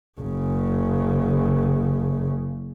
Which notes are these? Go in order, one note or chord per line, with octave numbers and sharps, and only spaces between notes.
F#1 C#3